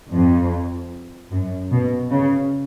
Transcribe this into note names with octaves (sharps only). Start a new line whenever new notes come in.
F2
F#2
B2
C#3